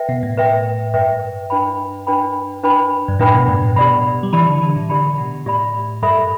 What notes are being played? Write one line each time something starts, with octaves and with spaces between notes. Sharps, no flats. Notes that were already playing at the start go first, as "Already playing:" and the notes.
Already playing: B4 E5 G5
B2
A2
B4 E5 G5
G2 B4 E5 G5
D4 B4 G5 B5
D4 B4 G5 B5
D4 B4 G5 B5
G2
A2 D4 B4 G5 B5
B2
G2
A2
B2 G4 D5 B5
G3
E3 G4 D5 B5
D3
D3
A2
D3 G4 D5 B5
B2
A2 G4 D5 B5
G2 A4 E5 B5